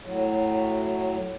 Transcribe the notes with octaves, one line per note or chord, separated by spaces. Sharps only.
A2 F#3